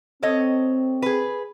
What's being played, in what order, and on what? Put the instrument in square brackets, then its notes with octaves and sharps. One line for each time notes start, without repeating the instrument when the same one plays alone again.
[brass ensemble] C4 [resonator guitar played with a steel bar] A4 C#5 D#5
[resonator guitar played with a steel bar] G#4 B4